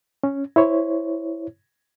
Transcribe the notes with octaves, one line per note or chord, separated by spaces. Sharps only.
C#4
E4 C5 C#5